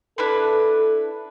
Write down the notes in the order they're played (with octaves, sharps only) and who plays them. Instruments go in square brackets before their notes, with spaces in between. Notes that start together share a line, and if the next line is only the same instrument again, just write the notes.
[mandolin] D4 E4 B4 [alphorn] A4